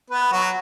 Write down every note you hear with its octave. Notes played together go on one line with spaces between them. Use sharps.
B3 B4
F#3 F#4